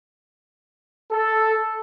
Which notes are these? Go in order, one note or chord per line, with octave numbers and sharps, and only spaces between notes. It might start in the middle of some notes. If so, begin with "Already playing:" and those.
A4